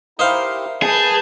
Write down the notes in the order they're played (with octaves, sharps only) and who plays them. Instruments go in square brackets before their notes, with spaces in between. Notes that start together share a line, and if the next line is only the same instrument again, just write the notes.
[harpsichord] D#4 C5 F5 [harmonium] E4 G4 A#4
[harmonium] A#3 [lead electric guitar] G#4 [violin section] B4 A5 G6